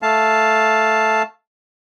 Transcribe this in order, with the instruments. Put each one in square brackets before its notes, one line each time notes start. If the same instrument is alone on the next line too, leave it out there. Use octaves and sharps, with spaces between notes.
[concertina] A3 F5 A5